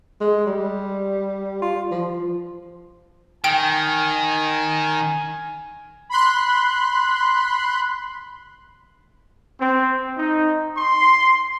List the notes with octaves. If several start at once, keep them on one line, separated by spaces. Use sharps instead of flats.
G#3
G3
F4
F3
D#3 G5 G#5 D7
B5 C6 F#6
C4
D#4
C6